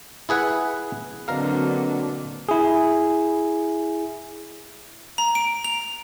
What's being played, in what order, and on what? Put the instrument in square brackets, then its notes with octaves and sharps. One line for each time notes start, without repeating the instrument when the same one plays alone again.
[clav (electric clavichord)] E4 G#4 B4 F#5
[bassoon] B2 [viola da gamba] D3 F#3 A#3 [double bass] C4 D4 [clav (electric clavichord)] A#4 F5
[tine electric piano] E4 G#4
[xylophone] A#5
D7
F7